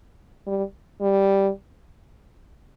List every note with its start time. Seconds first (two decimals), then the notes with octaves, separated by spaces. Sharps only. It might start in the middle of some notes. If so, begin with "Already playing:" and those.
0.47 G3
1.01 G3